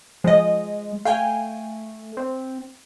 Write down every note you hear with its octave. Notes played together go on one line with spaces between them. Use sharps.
F3 G#3 D#5
A3 F5 G5 G#5
C4